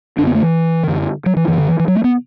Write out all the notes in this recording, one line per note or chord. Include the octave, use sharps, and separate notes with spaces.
F#2 D3 D4
B3
A3
E3
F#2 D3
F#3
E3
F#2 D3 E3
D3
E3
E3
F#3
A3
B3